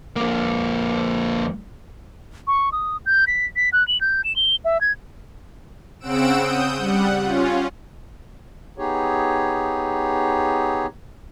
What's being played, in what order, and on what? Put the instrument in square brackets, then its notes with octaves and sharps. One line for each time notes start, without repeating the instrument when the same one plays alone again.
[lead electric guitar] F2 A#3
[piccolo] C#6
D#6
G6
B6
B6
F#6
F#7
G6
E7
G7
E5
G#6
[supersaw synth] C#3 C4 F#5 E6 D7 E7
D#6 G6
G3 F#5
C#4 F4
[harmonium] B3 D#4 G4 G#4 C#5